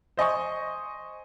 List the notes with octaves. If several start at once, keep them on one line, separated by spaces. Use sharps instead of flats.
C5 D#5 G#5 C#6